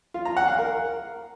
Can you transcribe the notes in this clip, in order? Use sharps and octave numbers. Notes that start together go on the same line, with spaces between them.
F4
A#5
F#5
F5
A#4